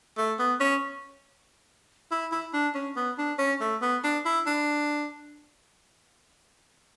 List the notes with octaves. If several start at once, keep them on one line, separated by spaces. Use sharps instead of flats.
A3
B3
C#4
E4
E4
D4
C#4
B3
D4
C#4
A3
B3
D4
E4
D4